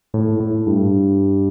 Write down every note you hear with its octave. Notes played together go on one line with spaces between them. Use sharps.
A2
A2
G2